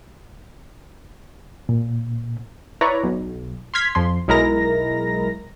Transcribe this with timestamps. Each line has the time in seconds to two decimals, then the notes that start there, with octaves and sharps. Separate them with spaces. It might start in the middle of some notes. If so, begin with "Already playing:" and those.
1.69 A#2
2.81 E4 B4 C#5 D5 A#5
3.04 B1
3.74 C6 F6 G#6 B6
3.95 F2 F3 C6
4.28 B1 G#3 E4 A#4 A#5 A#6